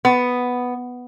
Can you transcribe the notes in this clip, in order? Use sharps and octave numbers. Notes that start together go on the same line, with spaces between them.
B3